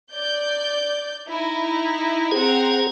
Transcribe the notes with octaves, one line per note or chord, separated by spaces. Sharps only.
D5 G6
D#4 E4
C4 G#4 F#5 A#5